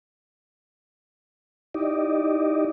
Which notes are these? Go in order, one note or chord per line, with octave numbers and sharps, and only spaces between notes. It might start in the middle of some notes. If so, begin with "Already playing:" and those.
D#4 E4 G4 D5 D#5